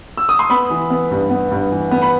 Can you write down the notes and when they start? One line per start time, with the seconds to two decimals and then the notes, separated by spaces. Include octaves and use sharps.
0.17 E6
0.29 D#6
0.39 C6
0.50 B3 B5
0.70 E3
0.90 B3
1.11 G2
1.30 B3
1.51 G2
1.71 E3
1.91 B3
2.02 B5